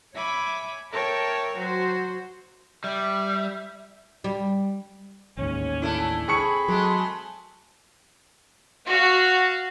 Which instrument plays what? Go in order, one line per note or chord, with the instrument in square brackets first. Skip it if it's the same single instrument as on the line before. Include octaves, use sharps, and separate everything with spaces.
[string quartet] C#5 E5 G#5 B5 D6
A#4 C#5 E5 G5 A5
F#3 F#4 C5
[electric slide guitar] G3 [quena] E5
[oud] G3
[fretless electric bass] A1 D#2 G#2 [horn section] C#4
[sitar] A3 D4 E4
[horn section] C4 A4 B5 [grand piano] G#4 C#6 C#7
[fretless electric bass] F#3 [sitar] G#3 A3
[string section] F#4 F5